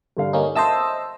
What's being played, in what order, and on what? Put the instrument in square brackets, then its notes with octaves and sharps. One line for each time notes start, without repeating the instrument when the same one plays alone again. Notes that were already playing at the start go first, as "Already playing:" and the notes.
[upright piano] G2 D3 F5
[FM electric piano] A#3 C#4 D#4
[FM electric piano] C5 D#5 E6 [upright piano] E5 A5